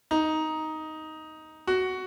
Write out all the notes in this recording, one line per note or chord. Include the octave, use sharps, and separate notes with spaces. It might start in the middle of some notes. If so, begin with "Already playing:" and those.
D#4
F#4